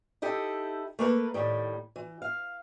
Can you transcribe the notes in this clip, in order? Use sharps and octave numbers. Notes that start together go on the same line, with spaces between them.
D#4 E4 G4 A4
A3 A#3 B4
A2 D#3 G3
E3
F5